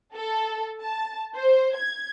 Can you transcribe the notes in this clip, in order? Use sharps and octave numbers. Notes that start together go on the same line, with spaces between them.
A4
A5
C5
G#6